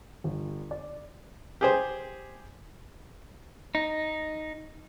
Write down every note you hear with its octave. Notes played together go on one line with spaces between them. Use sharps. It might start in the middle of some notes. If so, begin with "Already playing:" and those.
G1
D5
G4 G#4 C5
D#4